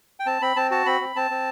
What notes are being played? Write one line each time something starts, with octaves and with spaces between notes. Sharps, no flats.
G5
C4 A5
C4 B5
C4 A5
F#4 A5
C4 B5
C4
C4 A5
C4